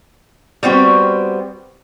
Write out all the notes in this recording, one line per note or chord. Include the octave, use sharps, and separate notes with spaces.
G3 B3 C4 F#4